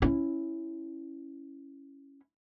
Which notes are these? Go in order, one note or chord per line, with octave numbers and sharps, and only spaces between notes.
C#4 E4